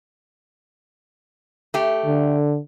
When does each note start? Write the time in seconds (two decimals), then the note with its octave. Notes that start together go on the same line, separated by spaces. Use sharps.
1.74 A3 G4
2.06 D3